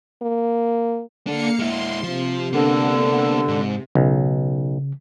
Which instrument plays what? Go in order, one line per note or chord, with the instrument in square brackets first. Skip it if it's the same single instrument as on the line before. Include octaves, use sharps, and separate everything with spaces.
[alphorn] A#3
[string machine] A#3 F5 C#7 [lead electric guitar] D4 A4
[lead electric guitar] G#3 E4 [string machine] C6
[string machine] C3 [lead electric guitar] F3
[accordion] D3 [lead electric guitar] A#3 B3
[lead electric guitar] G#2
[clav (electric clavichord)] B1 [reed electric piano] C#3